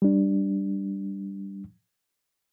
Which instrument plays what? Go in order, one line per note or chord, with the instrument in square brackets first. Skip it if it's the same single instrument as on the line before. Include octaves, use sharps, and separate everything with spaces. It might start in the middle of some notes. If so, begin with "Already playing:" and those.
[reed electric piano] G3 D4